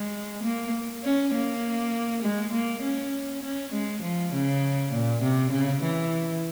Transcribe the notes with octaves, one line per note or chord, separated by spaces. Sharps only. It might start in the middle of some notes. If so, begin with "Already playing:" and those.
Already playing: G#3
A#3
C#4
A#3
G#3
A#3
C#4
C#4
G#3
F3
C#3
A#2
C3
C#3
E3